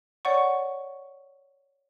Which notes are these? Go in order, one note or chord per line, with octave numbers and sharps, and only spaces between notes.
C#5 D5 F#5 C#6